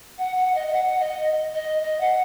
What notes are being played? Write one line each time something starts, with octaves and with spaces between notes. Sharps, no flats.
F#5
F#5
D#5
D#5
F#5
D#5
D#5
D#5
F#5